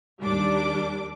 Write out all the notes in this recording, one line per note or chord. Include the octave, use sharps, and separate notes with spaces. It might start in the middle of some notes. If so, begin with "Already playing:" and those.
D#2 G3 D4 D6